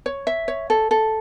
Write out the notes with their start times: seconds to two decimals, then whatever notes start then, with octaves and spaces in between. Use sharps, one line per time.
0.06 C#5
0.27 E5
0.48 C#5
0.70 A4
0.91 A4